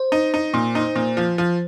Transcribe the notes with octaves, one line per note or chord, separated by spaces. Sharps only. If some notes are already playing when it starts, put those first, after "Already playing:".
Already playing: C5
D#4
D#4
A#2
D#4
A#2
F3
F3